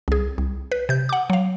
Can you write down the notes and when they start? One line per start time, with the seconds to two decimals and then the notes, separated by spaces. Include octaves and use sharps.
0.08 C2 G#4
0.38 C2
0.72 B4
0.89 C3 G6
1.09 F#5 D6
1.30 F#3 F5